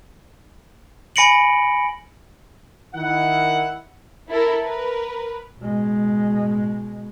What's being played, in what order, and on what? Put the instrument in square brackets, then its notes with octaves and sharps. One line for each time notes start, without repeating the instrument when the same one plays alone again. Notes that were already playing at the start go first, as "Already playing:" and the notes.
[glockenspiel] G#5 B5 A#6 C#7 D7 F#7
[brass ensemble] D#3 E4 F#5
[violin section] E4 A4 A#4
A#4 B4
[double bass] B2 G#3